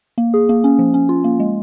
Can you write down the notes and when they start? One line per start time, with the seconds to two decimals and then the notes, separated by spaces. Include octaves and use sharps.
0.18 A#3
0.34 G#4
0.49 A#3
0.64 C#4
0.79 F3
0.94 C#4
1.09 F4
1.24 A#3
1.40 G#3